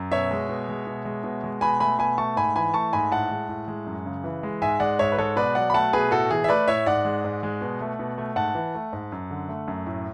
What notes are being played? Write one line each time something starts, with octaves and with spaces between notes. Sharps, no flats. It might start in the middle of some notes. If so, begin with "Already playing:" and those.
Already playing: F#2
B2 C#5 E5
G#3
B2
G#3
B2
G#3
B2
G#3
B2 G#5 B5
A3 G#5 B5
B2 G#5 B5
A3 A5 C#6
G#2 G#5 B5
E3 G#5 B5
A3 A5 C#6
G#2 G#5 B5
A2 F#5 A5
G#3
A2
G#3
F#2
C#3
E3
G#3
G#2 E5 G#5
G#3 D5 F#5
G#2 C#5 E5
B4
G#3 A4 C#5
B2 B4 D5
F#3 D5 F#5
B5
A3 F#5 A5
B2 G#4 B4
A2 F#4 A4
E3 G#4
E5
A3 B4 D5
A2 C#5 E5
G#2 D5 F#5
G#3
G#2
G#3
B2
A3
B2
A3
G#2 F#5 A5
E3
A3
G#2
F#2
D3
A3
F#2
A2